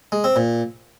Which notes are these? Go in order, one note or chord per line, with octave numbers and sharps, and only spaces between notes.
G#3
C4
A#2